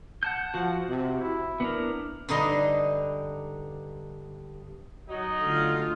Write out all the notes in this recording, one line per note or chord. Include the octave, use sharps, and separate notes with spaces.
F#5 A5 G6
F3 F#4 C5 F#5
C3
E4
B3 D4 A#4
G2 D3 D#4 D#5 C6
F#3 D#4 D#5
D3 A3 F4 F5